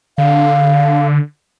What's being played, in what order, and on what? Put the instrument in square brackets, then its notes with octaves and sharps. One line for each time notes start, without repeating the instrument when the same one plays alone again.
[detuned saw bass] D3 [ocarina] F5